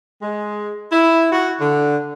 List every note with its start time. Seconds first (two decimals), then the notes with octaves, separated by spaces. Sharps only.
0.22 G#3
0.92 E4
1.32 F#4
1.61 D3